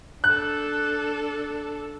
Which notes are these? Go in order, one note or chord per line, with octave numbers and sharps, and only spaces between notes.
D4 A4 F#6